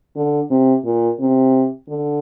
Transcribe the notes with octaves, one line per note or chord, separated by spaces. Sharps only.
D3
C3
A#2
C3
D3